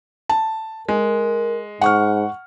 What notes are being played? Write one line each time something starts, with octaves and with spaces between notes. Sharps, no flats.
A5
G#3 A#4
G#2 F#5 C#6 F6